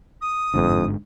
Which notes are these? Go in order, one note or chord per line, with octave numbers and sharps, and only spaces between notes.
D#6
G1 F2 G#2 D3